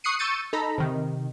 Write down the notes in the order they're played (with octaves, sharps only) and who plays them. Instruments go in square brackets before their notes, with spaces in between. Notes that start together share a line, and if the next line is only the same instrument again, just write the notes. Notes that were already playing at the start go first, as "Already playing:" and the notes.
[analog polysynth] C#6 D#6 F#6 C7 C#7 D#7
C#6 E6 G6 A6 C#7 D#7
D#4 A4 A#5 B5
C3 D#3